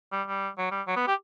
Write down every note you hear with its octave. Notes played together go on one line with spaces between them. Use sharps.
G3
G3
F#3
G3
F#3
B3
G4